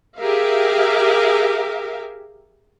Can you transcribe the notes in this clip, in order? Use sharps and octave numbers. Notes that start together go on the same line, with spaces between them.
G4 G#4 A#4 E5 F5